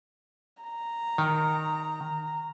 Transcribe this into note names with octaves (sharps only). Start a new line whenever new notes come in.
A#5
D#3